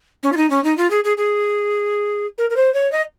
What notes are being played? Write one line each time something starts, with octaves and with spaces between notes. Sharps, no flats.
C#4
F4
D#4
C#4
D#4
F4
G#4
G#4
G#4
A#4
A#4
C5
C#5
D#5